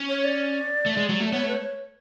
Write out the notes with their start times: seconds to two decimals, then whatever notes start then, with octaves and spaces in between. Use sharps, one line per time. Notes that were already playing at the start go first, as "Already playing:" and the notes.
Already playing: C#4
0.09 C#5
0.24 D5
0.86 A3
0.97 G#3
1.09 F#3
1.20 A3
1.32 B3 C#5
1.44 A3
1.48 B4
1.55 C#5